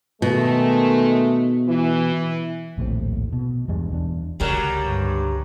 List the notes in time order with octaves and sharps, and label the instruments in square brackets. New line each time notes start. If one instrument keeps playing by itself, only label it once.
[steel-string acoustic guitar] B2 [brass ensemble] D#3 G#3 A3
[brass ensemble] E3
[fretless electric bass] A#1 D#2 A2 C4
B2
E2 G2 G#3 D4
E2 D4
[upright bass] C#2 D3 [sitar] F#3 G3 [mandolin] G#4 A#4
[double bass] G2